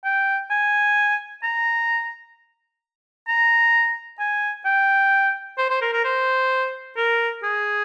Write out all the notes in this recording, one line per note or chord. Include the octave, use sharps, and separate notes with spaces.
G5
G#5
A#5
A#5
G#5
G5
C5
C5
A#4
A#4
C5
A#4
G#4